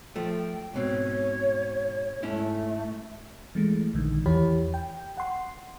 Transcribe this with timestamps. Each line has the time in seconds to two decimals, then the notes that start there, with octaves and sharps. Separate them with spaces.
0.16 F3 A3 G5
0.74 G#2 B2 C4 C#5
2.23 G#2 A3 C#4 E4
3.55 E3 G#3 A3
3.94 A#1 D3 D#3
4.26 E2 E3 G4 C#5 B5
4.74 G5
5.17 F#5 C6